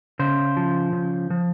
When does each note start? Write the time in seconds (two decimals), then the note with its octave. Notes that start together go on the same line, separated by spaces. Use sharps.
0.19 C#3 C5
0.57 F3
0.93 C#3
1.30 F3